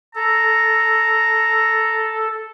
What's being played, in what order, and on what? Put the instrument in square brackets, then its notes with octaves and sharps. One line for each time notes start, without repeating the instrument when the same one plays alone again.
[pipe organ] A4 [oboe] A#5